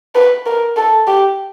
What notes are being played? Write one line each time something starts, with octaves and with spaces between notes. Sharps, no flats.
B4
A#4
A4
G4